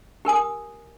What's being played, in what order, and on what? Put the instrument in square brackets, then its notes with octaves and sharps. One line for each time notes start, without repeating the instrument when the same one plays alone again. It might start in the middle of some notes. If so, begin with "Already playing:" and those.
[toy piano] G4 A#4 G#5 D#6